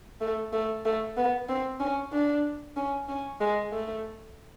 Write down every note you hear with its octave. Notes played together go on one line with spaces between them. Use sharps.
A3
A3
A3
B3
C4
C#4
D4
C#4
C#4
G#3
A3